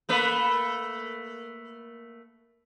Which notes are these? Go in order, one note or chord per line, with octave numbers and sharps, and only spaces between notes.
A3 A#3 B4